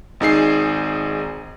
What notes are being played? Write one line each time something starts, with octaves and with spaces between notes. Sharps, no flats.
G#1 D#4 G#4 C7